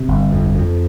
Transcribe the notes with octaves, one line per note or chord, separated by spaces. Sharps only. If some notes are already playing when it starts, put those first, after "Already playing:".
Already playing: C3
G1
F2
F2